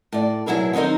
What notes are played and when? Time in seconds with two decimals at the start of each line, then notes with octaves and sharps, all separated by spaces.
0.12 A2 D5
0.46 B2 F#3 E4 G#4 A#4
0.73 D#3 F#3 C4 D#4 A#4